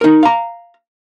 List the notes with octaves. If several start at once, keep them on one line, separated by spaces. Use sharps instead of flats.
D#4 A#4
F5 A#5